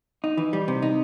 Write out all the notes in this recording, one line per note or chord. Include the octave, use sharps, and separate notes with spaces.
D#4
E3
G3
C3
D#4